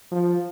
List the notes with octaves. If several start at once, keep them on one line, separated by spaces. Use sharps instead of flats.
F3